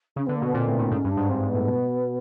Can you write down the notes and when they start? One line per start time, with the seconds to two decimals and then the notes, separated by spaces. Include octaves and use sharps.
0.16 C#3 C#4
0.26 D3 B3
0.35 A#3
0.42 B2
0.45 B3
0.54 A#2 C4
0.67 A2
0.79 A2
0.91 G#2 C#4
1.04 G2
1.11 D4
1.17 G#2
1.29 G2 C4
1.42 G#2
1.48 B3
1.54 A2
1.67 B2